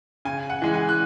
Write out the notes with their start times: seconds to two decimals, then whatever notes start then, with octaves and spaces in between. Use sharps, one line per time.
0.25 C#3 G#5
0.50 F#5
0.62 E3 G#3
0.74 G#5
0.89 F#6